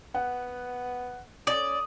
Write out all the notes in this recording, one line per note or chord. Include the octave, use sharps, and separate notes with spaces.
B3 F#5
C#4 D5 D#6